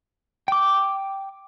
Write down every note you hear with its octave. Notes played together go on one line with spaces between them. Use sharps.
G5 D6